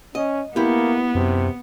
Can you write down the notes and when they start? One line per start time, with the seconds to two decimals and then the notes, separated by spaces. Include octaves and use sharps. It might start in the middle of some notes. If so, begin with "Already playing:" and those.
0.15 C#4 D#5
0.56 A#3 B3 E4 G4
1.15 F#2 C3